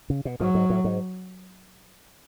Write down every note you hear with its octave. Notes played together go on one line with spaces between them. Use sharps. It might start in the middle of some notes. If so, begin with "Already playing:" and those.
C#3
B2
G#2 F#3
G#2
A2
G#2